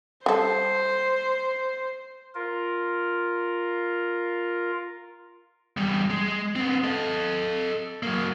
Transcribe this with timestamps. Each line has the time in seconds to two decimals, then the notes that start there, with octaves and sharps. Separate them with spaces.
0.26 G3 A4 C5
2.35 F4 A#4
5.77 E2 G3
6.10 G#3
6.56 B3 C4
6.84 A4 D#5
8.03 F#3 A#3